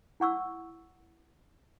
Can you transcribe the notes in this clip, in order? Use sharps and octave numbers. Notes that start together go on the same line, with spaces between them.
E4 F#5 C#6 E6